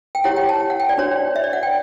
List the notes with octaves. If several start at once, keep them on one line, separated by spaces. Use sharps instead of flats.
G5
E4 G4 C#5 F#5
G5
A5
F#5
G5
D5
D4 F#4 C#5
E5
D5
F#5
G5